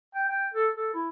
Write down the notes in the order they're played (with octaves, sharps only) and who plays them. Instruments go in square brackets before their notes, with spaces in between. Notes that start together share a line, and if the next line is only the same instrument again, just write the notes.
[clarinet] G5
G5
A4
A4
E4